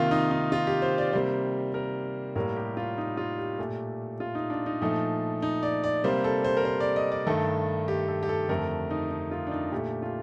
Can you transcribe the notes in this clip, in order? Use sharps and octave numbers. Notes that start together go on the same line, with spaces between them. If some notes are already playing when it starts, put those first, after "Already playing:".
Already playing: C3 D#3 A#3 F4
D#4
D#4
F4
G4
C5
D5
C3 G3 A#3 C5
A#4
A2 G3 A#3 A#4
G4
F4
D#4
F4
G4
A#2 A3
F4
D#4
D4
D#4
A#2 F3 A3 D#4
D#4
D5
D5
C3 G3 A#3 C5
A4
C5
A#4
C5
D5
D#5
D5
G2 D#3 A3 A4
G4
A4
G4
A4
F2 D3 A3 A#4
D#4
D#4
F4
D4
D#4
A#2 A3 G4
F4